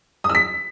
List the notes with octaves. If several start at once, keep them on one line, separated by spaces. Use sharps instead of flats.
D#6
E6
B6